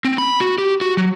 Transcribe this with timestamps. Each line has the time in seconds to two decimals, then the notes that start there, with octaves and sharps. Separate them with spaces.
0.05 C4
0.18 B5
0.41 F#4
0.58 G4
0.81 F#4
0.97 F#3